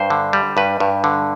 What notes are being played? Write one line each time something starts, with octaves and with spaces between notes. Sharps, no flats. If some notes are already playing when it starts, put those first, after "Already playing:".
Already playing: G2 C5
D3
G3
G2 B4
G2
D3